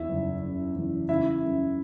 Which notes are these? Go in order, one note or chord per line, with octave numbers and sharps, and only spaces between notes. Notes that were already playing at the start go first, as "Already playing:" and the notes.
Already playing: E2 E4 E5
F#1
C#3
E3
C#3 E4 E5
F#2